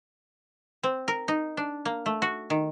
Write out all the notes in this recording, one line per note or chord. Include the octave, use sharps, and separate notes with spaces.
C4
A#4
D#4
D4
A#3
A3
F#4
D#3